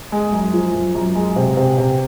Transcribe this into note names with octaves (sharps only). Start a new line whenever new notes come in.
G#3
F#2
F3
F#2
F#2
G#3
C3
C3
C3